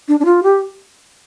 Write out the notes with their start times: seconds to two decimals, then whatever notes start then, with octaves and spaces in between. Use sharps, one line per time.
0.08 D4
0.20 D4
0.25 F4
0.43 G4